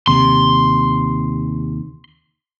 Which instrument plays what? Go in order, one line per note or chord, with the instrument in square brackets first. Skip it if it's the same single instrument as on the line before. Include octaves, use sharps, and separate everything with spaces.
[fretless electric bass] D#2 C3 [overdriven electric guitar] C6